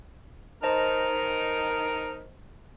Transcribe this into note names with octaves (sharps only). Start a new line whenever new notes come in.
D#4 A#4 C5 D#5 A5